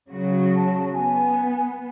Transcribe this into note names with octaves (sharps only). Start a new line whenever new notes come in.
C#3 F#3 F#4
A5
B3 G#5